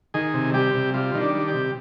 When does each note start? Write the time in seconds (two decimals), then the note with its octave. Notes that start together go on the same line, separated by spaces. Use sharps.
0.14 D#3 G#4
0.34 C3
0.54 G3 G4
0.74 C3
0.94 G3 F4
1.14 D#3
1.21 D4
1.34 G3
1.48 G4
1.54 C3